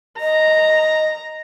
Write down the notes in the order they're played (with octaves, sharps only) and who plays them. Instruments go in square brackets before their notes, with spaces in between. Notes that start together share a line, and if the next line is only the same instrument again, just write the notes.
[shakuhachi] D#5 [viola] A#5